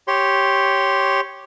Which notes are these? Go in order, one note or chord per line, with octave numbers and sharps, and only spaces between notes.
G4 C#5 C6